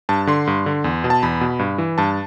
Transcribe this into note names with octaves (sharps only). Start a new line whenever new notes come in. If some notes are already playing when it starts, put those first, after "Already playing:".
G2 A5
D3 C6
G2
D3
E2
B2
A5
E2 B5
B2
G2
E3
G2 A5